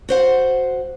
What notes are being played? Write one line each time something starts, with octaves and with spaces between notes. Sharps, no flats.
F#4 C5 F#5